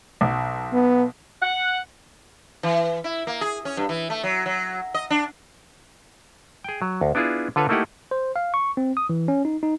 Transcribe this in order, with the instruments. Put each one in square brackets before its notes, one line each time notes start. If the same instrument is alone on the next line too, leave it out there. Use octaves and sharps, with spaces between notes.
[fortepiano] B1
[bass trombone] B3
[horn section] F#5
[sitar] E3
E4
A#3
G#4
C#4
G2
E3
A3
F#3
F#3
D#5
D4
[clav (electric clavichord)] G#4 G5
F#3
D2
B3 D4 E4 F4 G#4
D3 F4 A4 B4 C#5
A3 A#3 D#4 E4 G4 F#5
[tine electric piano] C5
F5
C#6
C4
D#6
E3
C#4
D#4
D#4